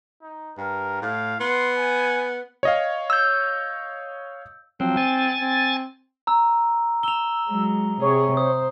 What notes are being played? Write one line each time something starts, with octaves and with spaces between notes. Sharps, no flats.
D#4
G2 A#4
A2 F5
B3 C6
G#5
C#5 D#5 F5
E6 G6
F3 F#3 C4
G#5 A6
C4
A#5 E6
E6 F7 G7
F#3 G#3
C3 G#4 C#5
C5 D#6